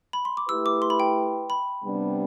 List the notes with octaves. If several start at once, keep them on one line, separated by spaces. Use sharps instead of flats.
B5
C6
D6
A3 E4 G4 B4 E6
D6
C6
B5
G5
B5
C3 G3 B3 D4